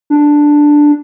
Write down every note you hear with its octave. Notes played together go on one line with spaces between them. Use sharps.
D4